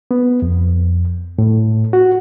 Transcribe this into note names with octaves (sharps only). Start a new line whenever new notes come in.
B3
F2
A2
F#4